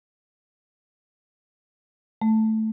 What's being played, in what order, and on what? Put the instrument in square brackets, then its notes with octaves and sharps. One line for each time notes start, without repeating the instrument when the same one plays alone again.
[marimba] A3